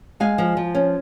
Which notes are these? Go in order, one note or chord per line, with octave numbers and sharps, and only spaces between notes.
G#3 F5 G#5
F3
F3
C#4